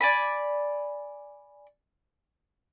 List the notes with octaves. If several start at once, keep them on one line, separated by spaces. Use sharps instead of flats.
D5 G#5 B5